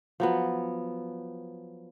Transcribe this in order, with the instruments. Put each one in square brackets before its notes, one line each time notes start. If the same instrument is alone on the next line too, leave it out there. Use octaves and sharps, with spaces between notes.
[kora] F3 F#3 B3